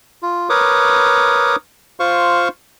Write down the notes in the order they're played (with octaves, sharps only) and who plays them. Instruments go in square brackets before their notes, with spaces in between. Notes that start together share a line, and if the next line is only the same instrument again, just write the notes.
[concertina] F4
A#4 B4 C#5 D6 D#6
F4 C5 F5 C#6